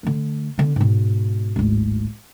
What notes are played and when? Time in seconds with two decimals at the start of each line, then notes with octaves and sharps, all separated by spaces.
0.03 D3 A3
0.58 D3 B3
0.76 G#2 B2
1.56 D1 G#1